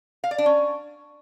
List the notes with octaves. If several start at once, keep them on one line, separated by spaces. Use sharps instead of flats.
F5
D5
D4
C#4